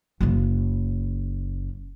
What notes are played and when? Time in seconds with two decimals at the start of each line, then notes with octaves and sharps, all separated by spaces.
0.21 F#1 C#3